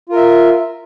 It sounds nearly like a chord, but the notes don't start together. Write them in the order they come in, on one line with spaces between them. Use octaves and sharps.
F4 A#4 E5